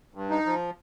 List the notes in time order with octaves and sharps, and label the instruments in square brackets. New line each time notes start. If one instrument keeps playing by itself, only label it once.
[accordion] G2
D#4
F3